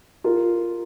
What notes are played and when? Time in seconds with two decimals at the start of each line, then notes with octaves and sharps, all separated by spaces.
0.24 F4 A#4